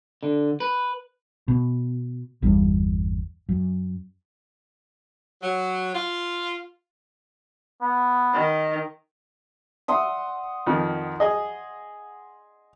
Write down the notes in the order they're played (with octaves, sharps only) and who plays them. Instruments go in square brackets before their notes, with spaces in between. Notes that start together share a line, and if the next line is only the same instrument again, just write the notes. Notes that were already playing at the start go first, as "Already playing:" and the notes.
[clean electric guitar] D3
B4
[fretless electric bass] B2
G1 E2 G2
F#2
[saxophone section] F#3
F4
[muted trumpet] B3
[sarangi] D#3
[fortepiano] E5 [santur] F#5 C6 D#6
[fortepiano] F2 D#3 F3
G#4 D#5